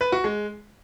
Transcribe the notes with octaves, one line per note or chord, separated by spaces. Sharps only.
B4
F#4
G#3